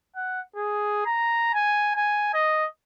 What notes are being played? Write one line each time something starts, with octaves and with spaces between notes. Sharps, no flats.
F#5
G#4
A#5
G#5
G#5
D#5